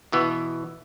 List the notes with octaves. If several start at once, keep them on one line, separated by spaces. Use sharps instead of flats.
B2 E3 B3